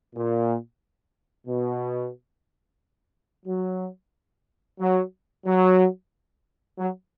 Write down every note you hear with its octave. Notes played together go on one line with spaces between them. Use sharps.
A#2
B2
F#3
F#3
F#3
F#3